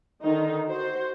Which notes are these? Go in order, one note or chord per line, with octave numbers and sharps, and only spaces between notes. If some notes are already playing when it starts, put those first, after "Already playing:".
D3 D#3 D#4
F#4 C5